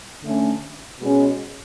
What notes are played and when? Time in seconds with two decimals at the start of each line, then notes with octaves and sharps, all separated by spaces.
0.23 D3 A3 C#4
1.00 B2 G#3 C#4